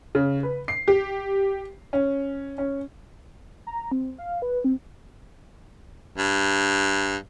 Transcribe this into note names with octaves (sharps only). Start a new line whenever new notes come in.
C#3
B4
C7
G4
C#4
C#4
A#5
C4
F5
B4
C4
G2